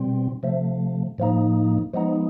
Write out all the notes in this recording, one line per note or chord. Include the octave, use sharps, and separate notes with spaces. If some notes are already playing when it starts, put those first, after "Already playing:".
Already playing: B2 G3 C4
C3 F3 A3
A2 F3 A#3 D#4
F3 G#3 B3 D#4